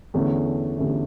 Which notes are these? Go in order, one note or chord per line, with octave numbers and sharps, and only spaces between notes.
E2 D3 A3 C#4 E4
E2 D3 A3 C#4 E4